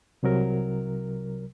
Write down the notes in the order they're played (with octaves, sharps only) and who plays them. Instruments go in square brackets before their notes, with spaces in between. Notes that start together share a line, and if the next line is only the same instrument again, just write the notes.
[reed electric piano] C2 C3 F#3 A#4